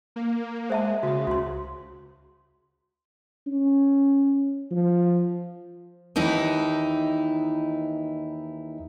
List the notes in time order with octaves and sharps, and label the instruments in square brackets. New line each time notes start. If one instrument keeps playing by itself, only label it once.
[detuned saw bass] A#3
[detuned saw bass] G#3 [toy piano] C5 E5 A5
[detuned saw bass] C#3 [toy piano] F#4 D#6
[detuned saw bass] C#2 [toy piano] F#4 C6
[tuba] C#4
F3
[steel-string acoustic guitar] D#2 E3 D#4 E4